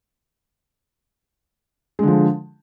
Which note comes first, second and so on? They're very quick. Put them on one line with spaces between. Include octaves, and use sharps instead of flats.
G#3 D3 F3